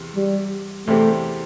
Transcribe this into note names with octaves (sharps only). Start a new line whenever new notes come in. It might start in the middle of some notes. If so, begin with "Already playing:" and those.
Already playing: E2 C3
G3
E2 C3 G3 A3 C4 G4